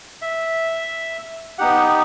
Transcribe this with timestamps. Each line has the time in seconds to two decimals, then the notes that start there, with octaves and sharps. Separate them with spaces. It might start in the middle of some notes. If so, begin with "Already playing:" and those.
0.22 E5
1.58 B3 D#4 G4 F#5